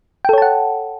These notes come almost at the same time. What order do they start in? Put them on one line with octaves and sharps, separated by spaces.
G5 A4 C#5 A5 F#5